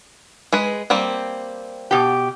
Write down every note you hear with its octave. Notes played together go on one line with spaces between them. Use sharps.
G#3 G#4 B4
G3 A#3 C4
B2 G4